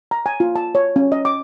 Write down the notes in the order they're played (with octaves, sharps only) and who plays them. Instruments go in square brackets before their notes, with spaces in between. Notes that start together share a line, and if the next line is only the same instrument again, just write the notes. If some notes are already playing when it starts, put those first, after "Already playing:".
[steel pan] A#5
G#5
F4
A5
C#5
C#4
D#5
D6